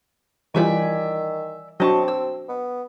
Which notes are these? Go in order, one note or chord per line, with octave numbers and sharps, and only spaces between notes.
D#3 E3 G3 F4 D5 E5 G#5
F#3 C4 D4 D#5 A5 C#6
E6
B3